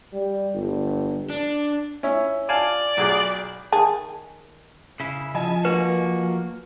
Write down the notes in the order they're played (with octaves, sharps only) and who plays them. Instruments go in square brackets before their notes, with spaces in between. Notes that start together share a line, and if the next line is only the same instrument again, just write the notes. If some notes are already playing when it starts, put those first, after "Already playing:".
[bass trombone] G3
G1
[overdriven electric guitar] D4
[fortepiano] C#4 E4
[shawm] D5 [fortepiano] F5 G#5 A5
[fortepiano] B1 G#4 D6
[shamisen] D#3 G#4 A5
[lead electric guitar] C#3 E4
[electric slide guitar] F3 [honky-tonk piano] D#5 G#5 A5
[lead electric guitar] A#3 F#4 [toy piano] B4